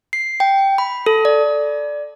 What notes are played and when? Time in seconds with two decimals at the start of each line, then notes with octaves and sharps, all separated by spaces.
0.13 C7
0.40 G5
0.78 B5
1.06 A4
1.25 D5